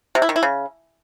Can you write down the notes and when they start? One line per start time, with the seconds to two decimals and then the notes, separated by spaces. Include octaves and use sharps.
0.15 C3
0.22 E4
0.29 D#3
0.36 E4
0.43 C#3